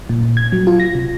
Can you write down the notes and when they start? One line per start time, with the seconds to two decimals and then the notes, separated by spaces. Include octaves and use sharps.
0.09 A#2
0.23 A#2
0.37 G#6
0.52 F#3
0.67 F4
0.80 A#6
0.95 C3